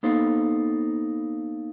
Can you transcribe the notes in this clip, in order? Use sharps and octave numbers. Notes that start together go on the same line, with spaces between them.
A#3 B3 D#4 A4 C5